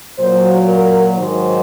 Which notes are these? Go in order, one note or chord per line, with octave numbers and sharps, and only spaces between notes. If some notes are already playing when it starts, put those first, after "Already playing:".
A#2 F#3 C5
A#4
G#2 D#3 F#3 C5